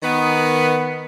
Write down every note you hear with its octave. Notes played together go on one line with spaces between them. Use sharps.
D#3 B3